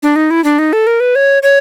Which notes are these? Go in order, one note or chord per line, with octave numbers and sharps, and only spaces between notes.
D4
D#4
E4
D4
D#4
A4
A#4
B4
C#5
C#5